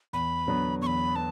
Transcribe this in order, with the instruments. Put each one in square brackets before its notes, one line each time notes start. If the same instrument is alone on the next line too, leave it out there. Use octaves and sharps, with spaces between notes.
[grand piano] E2 [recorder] B5
[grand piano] D3 F#3 B3
[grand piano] E2 [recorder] C#6
[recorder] B5
[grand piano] B3 [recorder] A5